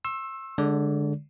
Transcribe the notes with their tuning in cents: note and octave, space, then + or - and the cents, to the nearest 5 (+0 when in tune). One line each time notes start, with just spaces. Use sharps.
C6 +45 E6 +0
D3 +0 G#3 +0 D5 -40